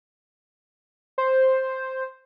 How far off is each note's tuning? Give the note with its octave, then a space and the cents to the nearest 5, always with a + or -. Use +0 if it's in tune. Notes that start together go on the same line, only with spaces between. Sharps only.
C5 +5